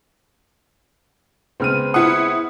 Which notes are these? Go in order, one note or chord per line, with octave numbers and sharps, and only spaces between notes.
C#2 B3 C4 F6 D#7
E4 F#5 D#6